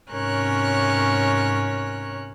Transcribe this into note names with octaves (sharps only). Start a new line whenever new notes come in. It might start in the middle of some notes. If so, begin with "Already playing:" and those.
G#2 C3 C#4 A#4 C#5 F#6